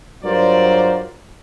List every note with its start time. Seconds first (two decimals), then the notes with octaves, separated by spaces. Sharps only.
0.24 G2 F#3 F4 A#4 C5 D5